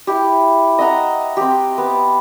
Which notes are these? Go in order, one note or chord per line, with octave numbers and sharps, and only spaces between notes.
E4 G4
D#5 E5 F#5 A#5
C4 G4
B3